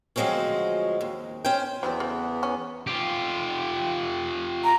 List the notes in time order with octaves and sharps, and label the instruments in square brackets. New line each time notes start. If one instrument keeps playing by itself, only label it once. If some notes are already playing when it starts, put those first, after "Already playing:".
[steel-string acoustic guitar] D2 F3 F#3 G#3 C4 C#4
D#2
C#4 C5 G5
[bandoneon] E2 E3 B3 [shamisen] F#3 G3 C4
[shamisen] C#3 A3
C#4
[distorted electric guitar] F4 G4
[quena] A#5